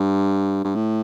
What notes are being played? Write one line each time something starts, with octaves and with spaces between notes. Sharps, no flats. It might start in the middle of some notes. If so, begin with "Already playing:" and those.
Already playing: G2
G2
A2